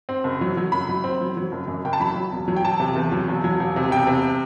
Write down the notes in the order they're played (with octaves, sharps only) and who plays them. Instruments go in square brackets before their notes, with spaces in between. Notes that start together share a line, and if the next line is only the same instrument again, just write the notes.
[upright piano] C4
F#1
F#3
F#3
F#1 B5
F#3
C4
F#3
F#3
F#1
F#2
F#1 G5
A5
F#3 B5
F#3
E1
F#3
G5
E1 A5
C3
E2
F#3
E1
F#3
E1
C3
E1 G5
C3